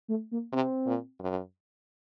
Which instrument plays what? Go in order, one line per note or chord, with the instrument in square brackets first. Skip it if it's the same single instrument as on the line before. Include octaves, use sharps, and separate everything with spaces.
[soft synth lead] A3
A#3
[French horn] C3 [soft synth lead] C4
[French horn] A#2
F#2